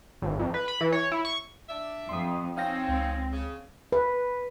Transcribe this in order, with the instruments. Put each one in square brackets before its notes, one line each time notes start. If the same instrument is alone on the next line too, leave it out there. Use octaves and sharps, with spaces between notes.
[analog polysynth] G#1
F2
B4
B5
E3
C#5
E4
C#6
[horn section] D4 D5 E5
[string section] F2 [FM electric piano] C6 D#6
[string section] C4 [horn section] C#4 D#4 [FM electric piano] F5 G5 A#6
[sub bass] C#2
[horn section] C#3
[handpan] B4